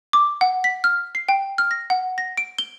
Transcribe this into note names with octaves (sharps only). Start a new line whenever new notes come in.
D6
F#5
B6
F6
C7
G5
F6
A#6
F#5
A#6
D7
G7